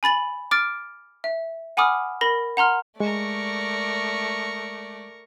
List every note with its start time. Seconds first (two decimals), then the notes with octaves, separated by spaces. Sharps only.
0.03 G#5 B5 A6 F#7
0.51 D6 F6 A6 D7
1.24 E5
1.77 F#5 G#5 B5 D6 D#6 F6
2.21 A#4 B5 A#6
2.57 F#5 A#5 C6 F6
3.00 G#3 A3 A#4 D5 C#6